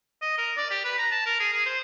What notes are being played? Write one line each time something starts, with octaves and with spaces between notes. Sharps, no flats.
D#5
A#4
D5
G4
B4
A#5
A5
A#4
G#4
G#4
C5